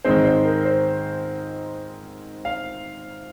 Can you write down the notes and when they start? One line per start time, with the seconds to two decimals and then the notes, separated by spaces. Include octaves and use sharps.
0.04 G#2 D#3 G#3 C4 C5
0.25 C5
0.45 A#4
0.65 C5
2.45 F5